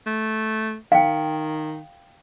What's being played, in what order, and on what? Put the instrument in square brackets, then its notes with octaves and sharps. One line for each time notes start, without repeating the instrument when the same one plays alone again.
[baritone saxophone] A3
[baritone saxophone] D#3 [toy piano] F5 G5